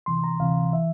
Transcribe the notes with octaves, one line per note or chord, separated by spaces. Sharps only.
D2 C3 E3 C6
A#5
D2 C3 E3 F5
E3 E5